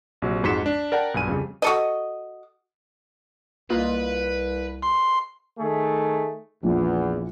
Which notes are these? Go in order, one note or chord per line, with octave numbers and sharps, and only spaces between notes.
A#1 C3 F#3
F2 G#2 F#4 C#6 B6 E7
D4
A#4 D5 F#5 G5 A5 A#5
B1 G2 G#5 D#7
F2 C#3 G3
F#4 A4 D#5
C2 A#3 F4 B4 D#5
C6
D#3 A3 G#4
A#1 E2